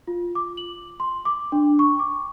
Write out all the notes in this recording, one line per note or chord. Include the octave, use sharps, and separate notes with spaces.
F4
D6
F#7
C6
D6
D4
C#6
D6